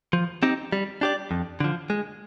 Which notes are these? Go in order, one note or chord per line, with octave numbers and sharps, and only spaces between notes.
F3
C4 D#4 G4
G3
D4 G4 D5
F2
D3 F3
G#3